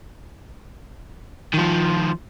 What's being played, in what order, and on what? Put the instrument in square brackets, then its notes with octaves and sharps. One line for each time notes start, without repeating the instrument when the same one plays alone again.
[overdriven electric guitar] D#3 F3